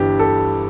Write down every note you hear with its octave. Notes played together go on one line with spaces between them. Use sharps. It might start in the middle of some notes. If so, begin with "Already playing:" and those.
Already playing: G1 G2 E3 G3 G4
A4